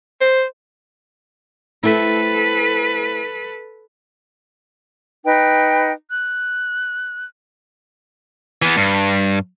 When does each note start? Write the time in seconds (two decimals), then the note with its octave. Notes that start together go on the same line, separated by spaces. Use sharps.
0.21 C5
1.83 A3 C4 E4 A4 B4
5.25 D#4 B4 G5
6.10 F#6
8.62 E3 B3
8.77 G2